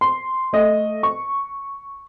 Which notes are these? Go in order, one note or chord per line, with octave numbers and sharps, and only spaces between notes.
C6
A3 D#5
C#6